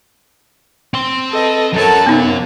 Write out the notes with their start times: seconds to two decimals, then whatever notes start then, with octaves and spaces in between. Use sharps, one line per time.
0.94 C4 C6
1.32 A4 B4 D#5
1.74 F#2 F#3 A4 A#4 A5
2.06 C3 A#3 B3 D#4